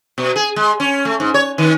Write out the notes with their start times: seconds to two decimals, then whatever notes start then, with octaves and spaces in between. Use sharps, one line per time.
0.18 B2
0.36 G#4
0.56 G#3
0.80 C#4
1.05 A3
1.20 G#2
1.34 C#5
1.58 D#3